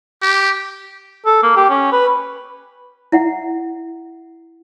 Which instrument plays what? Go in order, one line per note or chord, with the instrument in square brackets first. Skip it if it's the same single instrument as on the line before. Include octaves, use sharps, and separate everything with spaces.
[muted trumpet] G4
[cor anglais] A4
A#3
G4
C#4
B4
[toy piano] E4 E5 F#5